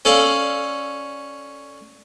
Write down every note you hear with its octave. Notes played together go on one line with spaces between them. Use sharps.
C#4 A4 D5 F5 A5